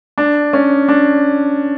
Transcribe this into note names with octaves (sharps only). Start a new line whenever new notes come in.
D4
C#4
D4